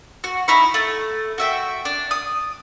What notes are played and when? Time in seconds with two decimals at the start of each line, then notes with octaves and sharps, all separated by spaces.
0.24 F#4
0.48 D#4 E4 C#6
0.74 A3
1.38 F#4 E5 G5
1.85 D4
2.11 D#6